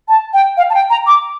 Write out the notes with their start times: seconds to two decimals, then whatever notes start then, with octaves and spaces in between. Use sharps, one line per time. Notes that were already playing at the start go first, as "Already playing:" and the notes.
0.08 A5
0.33 G5
0.57 F5
0.70 A5
0.74 G5
0.90 A#5
1.07 D6